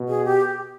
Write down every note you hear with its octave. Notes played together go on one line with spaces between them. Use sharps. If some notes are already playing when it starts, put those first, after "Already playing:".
Already playing: B2
G#4
G4